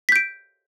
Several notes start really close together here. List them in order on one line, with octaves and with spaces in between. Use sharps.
B6 G6 D7